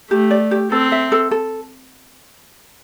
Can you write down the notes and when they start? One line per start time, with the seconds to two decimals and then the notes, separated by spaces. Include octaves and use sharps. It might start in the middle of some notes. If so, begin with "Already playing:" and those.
0.11 A3 G4
0.31 D5
0.51 G4
0.72 C4 A4
0.92 E5
1.12 A4
1.31 A4